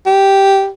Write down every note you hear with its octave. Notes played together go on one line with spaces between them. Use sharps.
G4